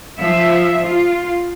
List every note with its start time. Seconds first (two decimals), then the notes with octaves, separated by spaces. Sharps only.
0.19 F3 E5
0.86 F4